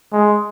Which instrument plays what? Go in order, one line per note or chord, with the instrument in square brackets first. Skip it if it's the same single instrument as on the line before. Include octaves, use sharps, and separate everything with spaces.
[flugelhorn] G#3